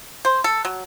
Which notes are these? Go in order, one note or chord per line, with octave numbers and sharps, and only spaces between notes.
C5
A4
F#3